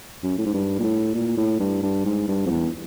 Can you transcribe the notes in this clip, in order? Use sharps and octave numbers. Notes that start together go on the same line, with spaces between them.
F#2
A2
G#2
G2
A#2
A2
A#2
A2
G2
G2
G#2
G2
F2
E2